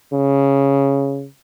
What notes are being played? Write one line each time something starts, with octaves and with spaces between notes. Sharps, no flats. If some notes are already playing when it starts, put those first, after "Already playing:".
C#3